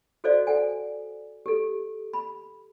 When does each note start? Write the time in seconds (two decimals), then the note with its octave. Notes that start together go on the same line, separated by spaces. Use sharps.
0.24 F#4 A4 C5 D5 D#5 F5
0.47 A4 F#5 G#5
1.46 G4 A4
2.13 B5